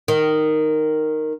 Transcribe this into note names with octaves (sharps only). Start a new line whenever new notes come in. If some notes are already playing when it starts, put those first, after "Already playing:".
D#3